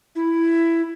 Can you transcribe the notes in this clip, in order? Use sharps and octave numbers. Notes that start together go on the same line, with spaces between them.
E4